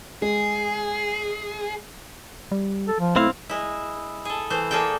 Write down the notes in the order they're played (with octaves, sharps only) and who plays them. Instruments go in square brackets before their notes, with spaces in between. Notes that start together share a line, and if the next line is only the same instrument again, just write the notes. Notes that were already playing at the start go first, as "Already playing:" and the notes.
[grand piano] G#3 [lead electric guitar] G#4
[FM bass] G3
[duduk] A4
F3
[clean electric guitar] B1 C4 F5 [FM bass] A3 [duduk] E4
[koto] G#3 E4
G#4 A4
E3 A3 C5
A#3 G#4 A4 D5 G5